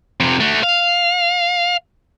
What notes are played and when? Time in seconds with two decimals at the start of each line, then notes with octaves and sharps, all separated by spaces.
0.20 F2 C3
0.40 A3 F#4
0.63 F5